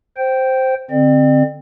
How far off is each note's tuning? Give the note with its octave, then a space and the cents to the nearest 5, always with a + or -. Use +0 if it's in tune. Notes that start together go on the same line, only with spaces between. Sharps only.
C5 +0 G5 -15
D3 +0 C4 +0 D5 +40